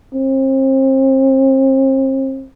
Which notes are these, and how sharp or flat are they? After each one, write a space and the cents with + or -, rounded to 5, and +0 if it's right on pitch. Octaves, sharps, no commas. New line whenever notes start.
C4 +35